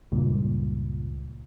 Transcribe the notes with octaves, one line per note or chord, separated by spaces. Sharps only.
C#2 G2 A#2